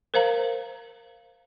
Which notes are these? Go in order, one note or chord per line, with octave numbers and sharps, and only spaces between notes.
A#4 C5 F5 A#5